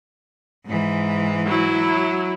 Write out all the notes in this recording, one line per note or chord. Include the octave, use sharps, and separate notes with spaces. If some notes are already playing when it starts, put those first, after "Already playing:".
G#2 E3
F#3 E4